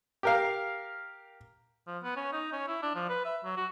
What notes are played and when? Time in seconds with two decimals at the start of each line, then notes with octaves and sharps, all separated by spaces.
0.23 G4 A#4 F5
1.87 F3
2.03 B3
2.16 C#4
2.32 D#4
2.53 C#4
2.68 E4
2.83 D4
2.95 F3
3.09 B4
3.25 E5
3.44 F#3
3.57 F#4